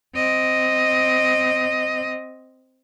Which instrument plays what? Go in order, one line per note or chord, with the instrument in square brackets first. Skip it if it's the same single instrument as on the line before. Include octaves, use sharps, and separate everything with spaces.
[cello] C4 D#5